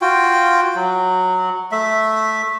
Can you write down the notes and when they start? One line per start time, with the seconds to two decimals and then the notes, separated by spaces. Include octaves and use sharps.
0.01 F4 F#4 G5
0.75 F#3
1.72 A3 E5